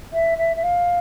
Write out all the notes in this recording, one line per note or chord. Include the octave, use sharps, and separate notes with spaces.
E5
E5
E5
F5